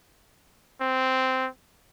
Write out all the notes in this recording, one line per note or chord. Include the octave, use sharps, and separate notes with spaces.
C4